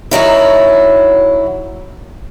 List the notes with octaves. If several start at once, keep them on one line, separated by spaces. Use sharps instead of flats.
F#2 D#3 F#3 E4